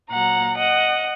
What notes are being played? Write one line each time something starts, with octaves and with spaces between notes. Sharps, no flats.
A#2 F#3 F#5 A#5
D#5 F#5